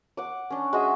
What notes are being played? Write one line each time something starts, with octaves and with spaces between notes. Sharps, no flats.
F#5 D6
C#4 D4
G#3 F#4 E5 G#5